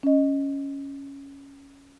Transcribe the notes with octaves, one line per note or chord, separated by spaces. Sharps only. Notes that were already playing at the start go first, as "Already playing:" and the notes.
C#4 D#5